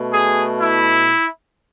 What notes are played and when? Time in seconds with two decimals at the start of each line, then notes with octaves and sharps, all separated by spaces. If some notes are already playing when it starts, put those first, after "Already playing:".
Already playing: B2 A3
0.12 G#4
0.59 E4